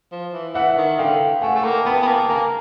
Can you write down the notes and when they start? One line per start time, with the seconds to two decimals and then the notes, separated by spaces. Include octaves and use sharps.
0.12 F3
0.33 E3
0.54 E3 E5 F#5
0.77 D#3
0.98 D3 F5 G5
1.42 A3 F#5 G#5
1.55 A3
1.64 A#3
1.85 B3 G5 A5
2.02 B3
2.07 A#3
2.29 A#3 G#5 A#5